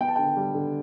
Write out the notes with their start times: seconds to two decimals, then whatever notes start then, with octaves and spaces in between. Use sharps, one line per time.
0.01 B3 G5
0.08 A5
0.16 D3 G5
0.37 G3
0.54 D3